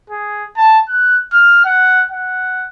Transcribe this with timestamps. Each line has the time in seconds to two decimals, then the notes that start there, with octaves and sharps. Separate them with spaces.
0.10 G#4
0.57 A5
0.89 F#6
1.33 F6
1.65 F#5
2.12 F#5